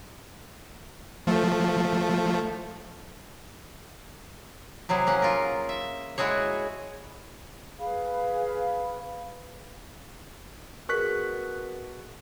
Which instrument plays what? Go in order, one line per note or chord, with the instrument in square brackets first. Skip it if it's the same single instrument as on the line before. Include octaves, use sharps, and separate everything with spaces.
[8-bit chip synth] F3 A3
[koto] C3 F#3 E4 G#4
A#3 C#4 F#5
F4 A#4
E5
G#3 E4 F#4 G#4 C#5
[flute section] G#4 B4 F5 B5
[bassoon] B2 [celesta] G#4 A#4 [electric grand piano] C#6 F#6 B6